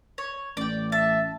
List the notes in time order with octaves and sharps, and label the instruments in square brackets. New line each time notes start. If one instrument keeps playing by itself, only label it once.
[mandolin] C#5
[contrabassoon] A1 [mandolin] D5 G5
[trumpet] E5 [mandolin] A5